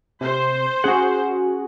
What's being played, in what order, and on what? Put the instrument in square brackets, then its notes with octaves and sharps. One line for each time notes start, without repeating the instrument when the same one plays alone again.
[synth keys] C3 [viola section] C5
[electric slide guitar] C#4 F#5 [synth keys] F#4 G#4